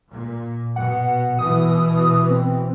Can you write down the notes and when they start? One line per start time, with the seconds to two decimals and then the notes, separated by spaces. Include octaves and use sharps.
0.10 A#2
0.76 B2 F#5
1.39 B2 E3 D#6
2.31 C4